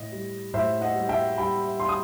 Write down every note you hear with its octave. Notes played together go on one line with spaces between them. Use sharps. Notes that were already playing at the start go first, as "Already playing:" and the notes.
Already playing: A2 D#5
G3
A2 C5 E5
D#5 F#5
G3
E5 G5
G3 G5 B5
C6
D#6